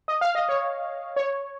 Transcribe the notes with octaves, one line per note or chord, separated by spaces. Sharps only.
D#5
F5
D#5
C#5
C#5